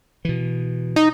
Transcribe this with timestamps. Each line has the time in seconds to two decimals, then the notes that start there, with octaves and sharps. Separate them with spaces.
0.25 B2 E3
0.96 D#4